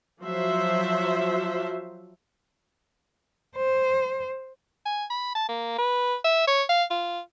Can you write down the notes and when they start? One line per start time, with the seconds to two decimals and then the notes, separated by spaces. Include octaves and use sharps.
0.21 F3 F#3 F#4 C5 E5
3.56 C5
4.86 G#5
5.10 B5
5.35 A5
5.49 A#3
5.79 B4
6.24 E5
6.47 C#5
6.69 F5
6.91 F4